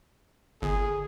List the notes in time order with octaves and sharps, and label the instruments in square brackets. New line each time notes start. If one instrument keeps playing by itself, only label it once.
[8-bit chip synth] G1 [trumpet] G#4